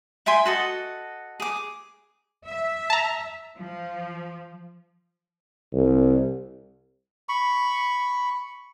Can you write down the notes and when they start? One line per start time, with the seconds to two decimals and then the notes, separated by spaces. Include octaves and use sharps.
0.26 E5 G5 G#5 C6
0.46 F#4 A4 D#5
1.40 G#4 D6
2.46 E5
2.90 A5 A#5
3.58 F3
5.72 C2
7.29 B5 C#6